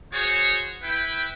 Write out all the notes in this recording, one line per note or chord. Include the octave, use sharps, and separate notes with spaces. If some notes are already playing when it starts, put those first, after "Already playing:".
F#4 G#4 C5 C#5
E4 B4 G5